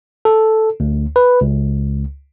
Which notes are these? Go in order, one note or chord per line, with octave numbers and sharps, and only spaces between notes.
A4
D2
B4
C#2